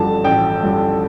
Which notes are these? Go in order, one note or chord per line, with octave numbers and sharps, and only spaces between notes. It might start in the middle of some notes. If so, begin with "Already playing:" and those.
Already playing: A1 G2 D3 F3 A5
A1 G5
G2 D3 F3